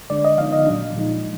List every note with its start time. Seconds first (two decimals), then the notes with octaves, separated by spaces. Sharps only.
0.10 D3 G#3 D4 D5
0.25 D#5
0.38 D3 F3 B3 D#4 F5
0.52 D#5
0.67 A#2 F#3 D4
0.95 A#2 F3 G#3 D#4